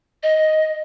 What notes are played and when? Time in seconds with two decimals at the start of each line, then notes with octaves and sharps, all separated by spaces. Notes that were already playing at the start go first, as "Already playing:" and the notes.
0.23 D#5